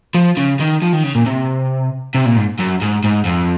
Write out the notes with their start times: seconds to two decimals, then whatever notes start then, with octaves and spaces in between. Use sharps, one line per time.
0.14 F3
0.37 C#3
0.60 D#3
0.82 F3
0.92 D#3
1.03 C#3
1.15 A#2
1.26 C3
2.15 C3
2.26 A#2
2.37 G#2
2.59 F#2
2.82 G#2
3.04 G#2
3.25 F2